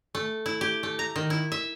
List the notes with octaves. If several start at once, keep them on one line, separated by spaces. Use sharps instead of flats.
A3
E4
G4
A3
A#5
D#3
E4
E5